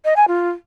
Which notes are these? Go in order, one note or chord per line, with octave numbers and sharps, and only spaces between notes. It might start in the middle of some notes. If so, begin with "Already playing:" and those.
D#5
G#5
F4